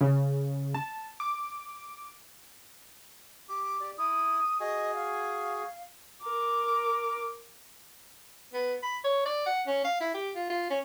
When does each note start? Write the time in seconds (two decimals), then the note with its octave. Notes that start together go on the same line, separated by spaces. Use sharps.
0.01 C#3
0.74 A5
1.20 D6
3.49 G4 D6
3.81 G4 D5
3.98 E4 D#6
4.60 F#4 G#4 D#5 G#5
4.94 F5
6.23 A#4 D6
8.54 B3
8.83 B5
9.04 C#5
9.25 D5
9.46 F#5
9.67 C#4
9.85 F5
10.01 E4
10.14 G4
10.35 F4
10.50 F4
10.70 C#4